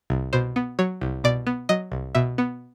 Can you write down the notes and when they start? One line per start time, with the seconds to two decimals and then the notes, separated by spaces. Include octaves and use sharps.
0.10 C2
0.33 B2 C5
0.56 B3
0.79 F#3 C#5
1.01 C2
1.24 B2 D5
1.47 B3
1.69 F#3 D#5
1.92 C2
2.15 B2 E5
2.38 B3